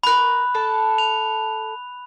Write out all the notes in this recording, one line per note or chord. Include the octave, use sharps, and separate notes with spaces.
A#4 B5 C#6 F#6
A4 A5
F7